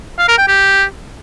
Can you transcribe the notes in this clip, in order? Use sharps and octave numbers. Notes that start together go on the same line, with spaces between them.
F5
A#4
G5
G4